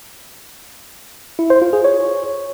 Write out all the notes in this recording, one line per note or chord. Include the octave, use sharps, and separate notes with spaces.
E4
C5
F4
G#4
C#5